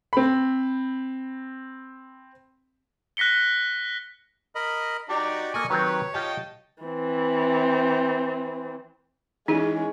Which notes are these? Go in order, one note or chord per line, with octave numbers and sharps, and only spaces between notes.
C4 B5
F#6 A#6 B6 C#7 G7
A#4 D#5 B5
D#4 F#4 G4 D5 A#5
A#3 A4 D5 D#5 G#5 C#6
D#3 F#3 C4 G4 B4 C#5
F4 G4 D#5 F#5 G5 A5
E3 C4
E3 G#3 C#4 D#4 G#4